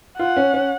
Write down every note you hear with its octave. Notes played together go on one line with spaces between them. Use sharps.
F4 F#5
C#4
C#4